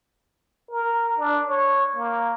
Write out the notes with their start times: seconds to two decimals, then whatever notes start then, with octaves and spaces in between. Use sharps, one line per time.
0.71 A#4
1.19 D4
1.48 C#5
1.96 A#3